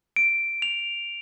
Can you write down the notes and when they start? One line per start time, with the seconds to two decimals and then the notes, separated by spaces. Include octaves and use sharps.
0.16 D7
0.62 F7